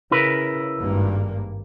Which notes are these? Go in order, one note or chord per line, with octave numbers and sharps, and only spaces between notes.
C#3 E4 A#4 B4
G#1 G2 A#3